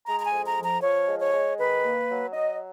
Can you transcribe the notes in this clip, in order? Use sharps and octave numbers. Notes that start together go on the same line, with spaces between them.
G#3 A#5
A#5
G#5
F2
A#5
F3
A#5
F3 C#5
G#3
C#5
G#3
D#3 B4
A#3
F#3
F#3 D#5